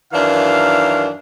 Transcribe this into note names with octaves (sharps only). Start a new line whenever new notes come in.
F#2 D#3 E3 D4 F5